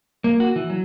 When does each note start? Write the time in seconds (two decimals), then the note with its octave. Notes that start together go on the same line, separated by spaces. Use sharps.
0.24 A#3
0.40 F#4
0.56 E3
0.70 F#3